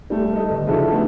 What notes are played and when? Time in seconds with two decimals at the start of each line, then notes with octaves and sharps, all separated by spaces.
0.10 G3 A3
0.33 A4 D#5
0.49 G1
0.67 C#3 F3 D4 E4 F#4 A4
0.92 A3 B3 D#4 E4 G4